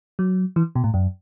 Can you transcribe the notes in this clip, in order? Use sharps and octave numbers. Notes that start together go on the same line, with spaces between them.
F#3
E3
B2
A2
F#2